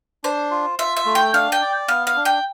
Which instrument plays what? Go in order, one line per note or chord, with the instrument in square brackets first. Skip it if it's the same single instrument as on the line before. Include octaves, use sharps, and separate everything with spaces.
[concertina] D4 [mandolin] C5
[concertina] F4
[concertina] F4 [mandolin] E5
[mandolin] E5
[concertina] A3
[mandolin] G5
[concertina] D4 [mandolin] F5
[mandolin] G5
[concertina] D5
[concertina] B3 [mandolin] F5
[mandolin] F5
[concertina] D4
[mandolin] G5